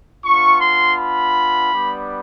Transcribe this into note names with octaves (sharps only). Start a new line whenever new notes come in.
B3 D4 F4 C#6
C6
B5
G3 B3 D4